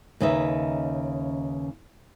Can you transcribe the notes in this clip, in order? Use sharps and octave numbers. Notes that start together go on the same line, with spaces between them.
D#2 C#3 C#4 D#4 B4 E5